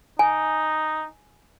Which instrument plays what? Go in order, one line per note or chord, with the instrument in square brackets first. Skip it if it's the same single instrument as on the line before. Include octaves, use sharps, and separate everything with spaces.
[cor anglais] D#4 [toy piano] G#5